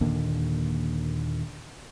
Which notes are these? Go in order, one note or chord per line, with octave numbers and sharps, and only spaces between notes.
D#2 A#2 D3